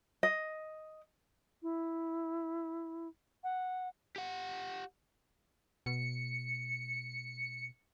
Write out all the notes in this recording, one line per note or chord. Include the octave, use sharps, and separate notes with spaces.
D#5
E4
F#5
G4 F#5
B2 C#7